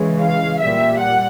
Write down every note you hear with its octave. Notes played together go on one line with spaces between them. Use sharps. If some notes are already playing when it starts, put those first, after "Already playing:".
Already playing: C#3 E3 G#3
F5
A#2 G3 E5
F#5